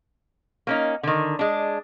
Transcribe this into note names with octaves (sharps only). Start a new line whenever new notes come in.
A#3 C#4 D#4
D3 D#3
G#3 D4